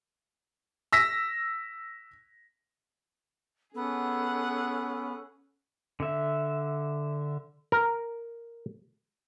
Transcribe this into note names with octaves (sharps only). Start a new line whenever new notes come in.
E6 A#6 B6
B3 C#4 G#4 A4 F#5
D3 E5
A#4